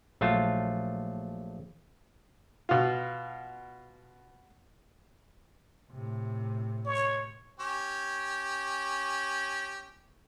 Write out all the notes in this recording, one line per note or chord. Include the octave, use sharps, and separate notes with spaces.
A#1 F#3 A3 F4 A5
B2 F4
A2 C3
C#5
C#4 G4